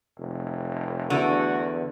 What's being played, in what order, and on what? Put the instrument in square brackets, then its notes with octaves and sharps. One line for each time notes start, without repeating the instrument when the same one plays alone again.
[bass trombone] F1
[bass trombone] E2 [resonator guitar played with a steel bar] D3 [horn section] A3 E4 F#4